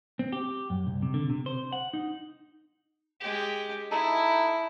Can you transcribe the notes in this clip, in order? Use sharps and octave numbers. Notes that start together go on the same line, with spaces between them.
C4
G4
F#2
C2
C3
D3
C3
C5
F#5
D#4
G#3 G4
D#4 E4 A4